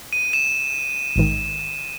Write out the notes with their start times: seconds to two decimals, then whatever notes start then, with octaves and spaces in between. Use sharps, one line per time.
0.13 D#7
0.33 E7
1.16 A1 G#2 D#3